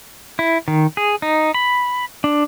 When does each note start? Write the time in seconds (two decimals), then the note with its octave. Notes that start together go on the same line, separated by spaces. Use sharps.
0.39 E4
0.68 D#3
0.97 G#4
1.22 D#4
1.54 B5
2.24 D4